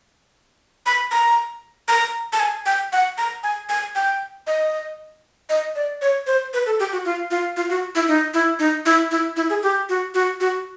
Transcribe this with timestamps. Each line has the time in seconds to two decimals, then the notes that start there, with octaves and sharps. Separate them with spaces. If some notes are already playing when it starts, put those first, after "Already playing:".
0.86 B5
1.11 A#5
1.88 A#5
2.33 A5
2.40 G#5
2.66 G5
2.92 F#5
3.18 A#5
3.43 G#5
3.69 G#5
3.95 G5
4.47 D#5
5.49 D#5
5.75 D5
6.02 C#5
6.27 C5
6.53 B4
6.66 A4
6.80 G4
6.92 F#4
7.05 F4
7.31 F4
7.57 F4
7.70 F#4
7.95 E4
8.08 D#4
8.34 E4
8.59 D#4
8.86 E4
9.11 E4
9.36 E4
9.50 G#4
9.63 G4
9.89 F#4
10.14 F#4
10.40 F#4